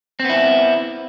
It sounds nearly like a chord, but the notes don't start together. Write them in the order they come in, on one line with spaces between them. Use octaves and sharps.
C4 B3 E4